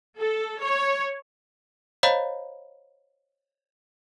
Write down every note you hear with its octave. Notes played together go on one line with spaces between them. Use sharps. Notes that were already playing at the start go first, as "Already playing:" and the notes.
A4
C#5
C5 C#5 D#5 F5 A#5 B5